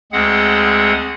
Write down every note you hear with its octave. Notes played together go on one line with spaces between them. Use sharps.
D2 G#3 C4 G#4 F#5